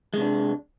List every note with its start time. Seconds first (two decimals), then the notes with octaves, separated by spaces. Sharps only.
0.14 G#3
0.17 C3
0.21 D4